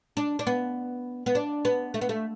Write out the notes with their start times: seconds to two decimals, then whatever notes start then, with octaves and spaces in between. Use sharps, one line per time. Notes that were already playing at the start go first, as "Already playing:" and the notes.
0.17 D4
0.39 D4
0.47 B3
1.26 B3
1.35 D4
1.65 B3
1.94 A3
2.01 B3
2.09 A3